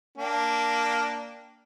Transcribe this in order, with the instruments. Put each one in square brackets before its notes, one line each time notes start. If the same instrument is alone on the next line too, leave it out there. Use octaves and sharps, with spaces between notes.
[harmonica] A#3 D4 G5